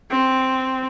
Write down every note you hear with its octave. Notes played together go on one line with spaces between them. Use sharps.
C4